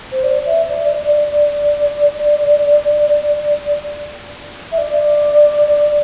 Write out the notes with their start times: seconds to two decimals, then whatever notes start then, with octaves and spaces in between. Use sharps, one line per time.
0.12 C5
0.24 D5
0.46 E5
0.69 D5
0.92 D5
1.15 D5
4.72 E5
4.78 D5